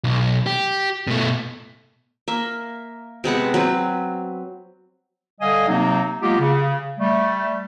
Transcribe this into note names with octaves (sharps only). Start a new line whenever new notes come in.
B1
G4
B2 A3
A#3 E5
C3 G#3 B3 F#5
F#3 C4 B4
D3 G3 D#5 F5 G#5 D#6
C3 F#3 A#3 C4 D#4
F#3 G#3 A#3 B3 F4 G4
C#3
G3 A3